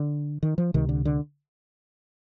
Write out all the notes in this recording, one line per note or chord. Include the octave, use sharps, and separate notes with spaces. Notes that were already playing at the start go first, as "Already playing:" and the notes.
Already playing: D3
D#3
F3
C#2 C3 D#3
D3
D3